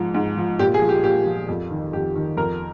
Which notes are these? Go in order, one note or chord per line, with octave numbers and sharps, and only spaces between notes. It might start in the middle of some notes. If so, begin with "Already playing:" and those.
Already playing: G#2 F3
G#2
F3
A#2 G4
G#4
F3
G4
A#2 G4
F3
F2
D#3
F2 G4
D#3
F2 A#4